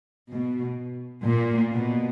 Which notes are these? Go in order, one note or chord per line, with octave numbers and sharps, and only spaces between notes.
B2
A#2
B2